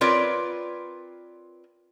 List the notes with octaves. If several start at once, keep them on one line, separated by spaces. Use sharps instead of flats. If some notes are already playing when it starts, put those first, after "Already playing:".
C4 F4 A#4 B4 C#5 D5